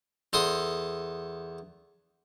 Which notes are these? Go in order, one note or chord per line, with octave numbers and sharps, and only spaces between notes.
E2 A4 C6 D#6